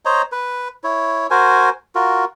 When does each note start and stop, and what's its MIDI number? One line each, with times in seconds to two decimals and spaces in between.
0.05 0.22 72
0.05 0.22 73
0.05 0.22 75
0.05 0.22 82
0.32 0.68 71
0.84 1.27 64
0.84 1.27 73
1.31 1.69 66
1.31 1.69 70
1.31 1.69 72
1.31 1.69 80
1.95 2.25 65
1.95 2.25 66
1.95 2.25 70